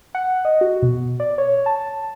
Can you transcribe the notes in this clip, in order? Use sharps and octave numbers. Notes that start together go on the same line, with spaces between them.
F#5
D#5
F#4
B2
D5
C#5
A5